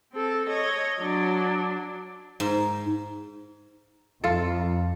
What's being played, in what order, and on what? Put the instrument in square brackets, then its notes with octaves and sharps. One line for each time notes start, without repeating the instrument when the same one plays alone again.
[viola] C4 A4
C#5 D#5
F#3 D4
[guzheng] G#2
[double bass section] F2 [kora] F4 A4